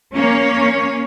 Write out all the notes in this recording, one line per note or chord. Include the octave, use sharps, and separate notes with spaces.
A#3 C#4 C#5